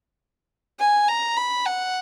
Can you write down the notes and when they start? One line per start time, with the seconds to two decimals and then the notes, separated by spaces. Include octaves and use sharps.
0.80 G#5
1.08 A#5
1.37 B5
1.66 F#5